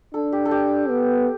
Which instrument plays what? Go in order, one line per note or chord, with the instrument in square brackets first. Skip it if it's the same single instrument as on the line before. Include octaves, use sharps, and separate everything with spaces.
[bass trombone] D4 [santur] A4
[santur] G4
A4
G4
[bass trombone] B3